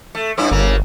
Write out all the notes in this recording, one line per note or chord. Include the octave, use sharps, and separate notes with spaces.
A3
G2 C#4 E4
G1 C#3 A#3